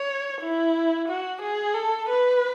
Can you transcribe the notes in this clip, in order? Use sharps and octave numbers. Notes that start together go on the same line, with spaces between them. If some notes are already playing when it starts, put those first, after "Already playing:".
Already playing: C#5
E4
F#4
G#4
A4
B4